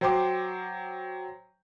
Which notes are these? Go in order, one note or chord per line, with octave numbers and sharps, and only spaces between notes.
F#3 C5 G5 C6 D6